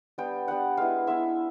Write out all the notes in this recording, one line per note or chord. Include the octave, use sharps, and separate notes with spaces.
G3 B3 D4 G5
G3 B3 D4 F#5
G#3 B3 E4 F5
G#3 B3 E4 E5